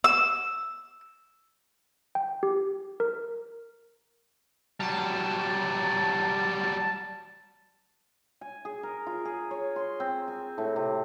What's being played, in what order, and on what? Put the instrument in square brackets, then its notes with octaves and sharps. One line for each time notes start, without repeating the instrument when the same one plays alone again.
[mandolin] E6
[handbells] G5
G4
A#4
[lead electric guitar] F#3 G3 [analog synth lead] A5
[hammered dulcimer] G#5
G#4
A#4
F4
G#4
C#5
C6
C4
G#5
A2
C3